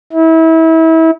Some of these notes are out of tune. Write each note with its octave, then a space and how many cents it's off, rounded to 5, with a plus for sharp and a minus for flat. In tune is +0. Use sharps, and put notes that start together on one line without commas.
E4 -30